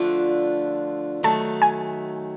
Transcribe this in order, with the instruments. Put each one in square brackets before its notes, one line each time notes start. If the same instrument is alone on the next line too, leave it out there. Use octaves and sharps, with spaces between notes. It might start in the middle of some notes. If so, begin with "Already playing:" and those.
Already playing: [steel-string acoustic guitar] D3 F3 A3 D4 F4
[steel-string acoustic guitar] D#3 F#3 A3 [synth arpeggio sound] A5
[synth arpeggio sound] G#5